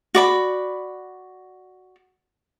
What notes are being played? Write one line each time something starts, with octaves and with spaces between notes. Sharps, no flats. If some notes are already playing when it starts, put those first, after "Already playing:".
F#4 D5 B5